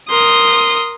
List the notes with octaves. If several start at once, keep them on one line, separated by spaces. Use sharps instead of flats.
A#4 C6 D#6